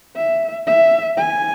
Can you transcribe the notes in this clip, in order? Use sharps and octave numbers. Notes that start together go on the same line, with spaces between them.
E5
E5
G#5